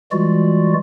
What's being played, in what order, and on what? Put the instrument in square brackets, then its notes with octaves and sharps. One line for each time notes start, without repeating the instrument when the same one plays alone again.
[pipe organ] E3 G3 G#3 F4 F#4 D5